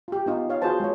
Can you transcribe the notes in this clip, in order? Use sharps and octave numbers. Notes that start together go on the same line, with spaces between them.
F4 G4
B3 D#4 F4
C#5 F5
F4 F#4 G#4 B4 C5 A5
G#3 C#5